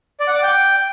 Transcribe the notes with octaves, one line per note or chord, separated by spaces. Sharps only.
D5
F#5
D6
G5